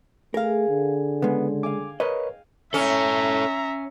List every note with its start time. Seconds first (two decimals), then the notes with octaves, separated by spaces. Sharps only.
0.34 A3 G#4 A#4 F5
0.69 D3
1.22 C#3 G#3 B3
1.63 F5 G5 G#5 D6
2.00 A#4 B4 C#5 D#5
2.74 C#4 A4 C#5 E5 A#5